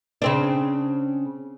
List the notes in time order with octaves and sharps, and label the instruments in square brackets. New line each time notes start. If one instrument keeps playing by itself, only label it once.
[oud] C#3 C4 D4